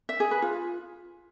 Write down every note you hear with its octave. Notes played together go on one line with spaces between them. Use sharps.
E5
G#4
B4
F4